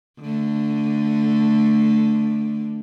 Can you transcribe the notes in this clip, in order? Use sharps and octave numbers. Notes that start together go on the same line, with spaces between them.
D3 A3